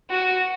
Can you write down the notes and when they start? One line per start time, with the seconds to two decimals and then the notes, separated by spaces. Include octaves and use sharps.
0.10 F#4